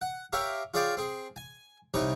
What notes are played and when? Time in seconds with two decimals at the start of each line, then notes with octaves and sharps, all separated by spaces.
0.01 F#5
0.33 G4 A#4 C#5 E5 F5
0.74 F4 G#4 C#5 D5 F5 G5
0.97 C4 G#4
1.36 G#5
1.94 C2 C3 G3 D#4 C#5 G#5